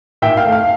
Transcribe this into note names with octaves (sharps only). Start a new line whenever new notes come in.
A#2 E5 G5
F5
A3
F5